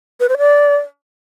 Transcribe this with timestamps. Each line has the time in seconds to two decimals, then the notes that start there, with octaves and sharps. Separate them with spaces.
0.20 B4
0.29 C5
0.38 D5